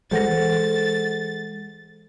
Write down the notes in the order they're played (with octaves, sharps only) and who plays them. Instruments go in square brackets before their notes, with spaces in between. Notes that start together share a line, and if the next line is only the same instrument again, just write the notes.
[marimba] E3 A#6 [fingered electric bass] G#3 [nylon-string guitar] A4 C5 F#5 [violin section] A6